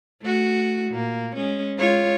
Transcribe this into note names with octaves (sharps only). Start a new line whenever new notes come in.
A3 F#4
A#2 A#3
G#3 C#4
G#3 F4 C#5